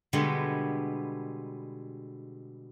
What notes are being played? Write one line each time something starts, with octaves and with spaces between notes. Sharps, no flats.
B2 D3 G3 G#3 B3